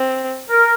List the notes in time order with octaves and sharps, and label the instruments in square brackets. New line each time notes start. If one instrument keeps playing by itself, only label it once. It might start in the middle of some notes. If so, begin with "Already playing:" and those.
Already playing: [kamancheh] C4
[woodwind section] A#4